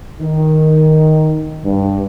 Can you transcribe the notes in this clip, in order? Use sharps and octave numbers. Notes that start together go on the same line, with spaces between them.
D#3
G2